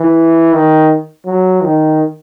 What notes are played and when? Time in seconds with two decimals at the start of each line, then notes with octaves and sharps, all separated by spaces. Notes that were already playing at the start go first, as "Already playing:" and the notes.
Already playing: E3
0.53 D#3
1.26 F#3
1.62 D#3